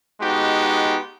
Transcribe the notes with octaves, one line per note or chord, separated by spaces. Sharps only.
G#3 B3 D#4 F#4 G4